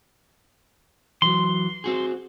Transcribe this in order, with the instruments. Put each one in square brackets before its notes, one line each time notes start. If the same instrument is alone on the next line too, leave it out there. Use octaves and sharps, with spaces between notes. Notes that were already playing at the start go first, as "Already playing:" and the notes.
[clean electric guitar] E3 F#3 [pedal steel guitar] C6
[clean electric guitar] C4 F#4 G#4